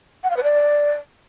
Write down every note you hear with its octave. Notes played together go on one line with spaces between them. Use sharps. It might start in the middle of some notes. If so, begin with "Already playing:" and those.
F#5
F5
B4
D5